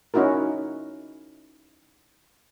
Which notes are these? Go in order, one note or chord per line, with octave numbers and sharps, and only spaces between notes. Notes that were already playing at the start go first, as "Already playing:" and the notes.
C#4 D#4 E4 F#4 A#4